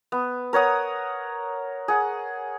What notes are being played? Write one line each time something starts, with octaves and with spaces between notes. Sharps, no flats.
B3
A#4 C#5 F#5 D#6
G#4 F#5